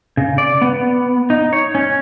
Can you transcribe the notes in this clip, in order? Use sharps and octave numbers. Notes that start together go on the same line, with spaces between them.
C#3
D5
B3
D#4
C#5
C#4